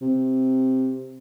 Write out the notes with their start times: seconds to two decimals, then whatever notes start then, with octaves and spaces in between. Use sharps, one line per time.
0.01 C3